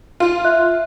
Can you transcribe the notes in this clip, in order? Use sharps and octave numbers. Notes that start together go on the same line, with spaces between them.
F4
E5 F#6